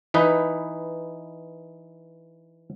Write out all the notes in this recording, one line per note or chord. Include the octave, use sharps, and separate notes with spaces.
E3 D#4 B4